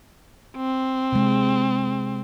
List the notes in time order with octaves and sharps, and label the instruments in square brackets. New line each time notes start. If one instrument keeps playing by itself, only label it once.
[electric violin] C4
[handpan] C3 G#3